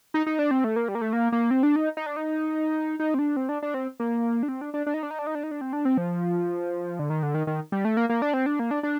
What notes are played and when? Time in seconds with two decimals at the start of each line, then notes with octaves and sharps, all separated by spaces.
0.14 D#4
0.26 D#4
0.39 D4
0.51 C4
0.64 A3
0.76 A#3
0.88 G3
0.95 A#3
1.01 A3
1.13 A#3
1.32 A#3
1.51 C4
1.63 D4
1.76 D#4
1.97 D#4
2.06 D4
2.16 D#4
3.00 D#4
3.14 C4
3.19 D4
3.36 C4
3.49 D4
3.62 D4
3.74 C4
4.00 A#3
4.43 D4
4.48 C4
4.61 D4
4.74 D4
4.86 D4
4.94 D#4
5.03 D4
5.11 D#4
5.19 D4
5.27 D#4
5.35 D4
5.43 D#4
5.51 D4
5.61 C4
5.73 D4
5.85 C4
5.97 F3
6.99 D3
7.10 D#3
7.23 D3
7.34 D#3
7.47 D#3
7.72 G3
7.85 A3
7.97 A#3
8.09 A#3
8.22 D4
8.34 C4
8.46 D4
8.59 A#3
8.71 D4
8.83 D4